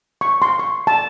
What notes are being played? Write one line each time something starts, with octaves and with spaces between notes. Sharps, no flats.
C#6
C6
C#6
A5